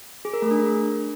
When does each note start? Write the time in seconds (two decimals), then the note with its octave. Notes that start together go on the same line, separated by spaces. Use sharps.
0.25 G#4
0.33 A#4
0.42 A3
0.51 D4